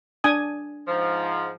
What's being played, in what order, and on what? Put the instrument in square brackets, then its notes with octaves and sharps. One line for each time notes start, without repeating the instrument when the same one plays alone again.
[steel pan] D4 G#5 D#6
[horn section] G#2 F3